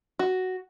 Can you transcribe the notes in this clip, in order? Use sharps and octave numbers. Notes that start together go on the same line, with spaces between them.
F#4